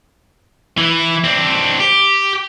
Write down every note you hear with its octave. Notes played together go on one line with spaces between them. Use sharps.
E3 E4
C4 D4
G4